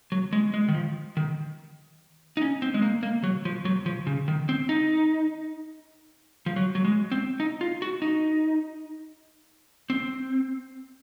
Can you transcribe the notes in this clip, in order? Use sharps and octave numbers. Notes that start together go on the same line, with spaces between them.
F#3
G#3
G#3
D#3
F3
D#3
D#4
C#4
C4
G#3
A#3
A#3
F#3
F3
F#3
F3
C#3
D#3
C4
D#4
F3
F#3
F#3
G#3
C4
D#4
F4
F#4
D#4
C4